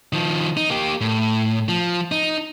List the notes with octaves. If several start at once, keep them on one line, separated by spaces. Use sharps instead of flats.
D#3 F3
D#4
A#3 G4
A2
F3
D#4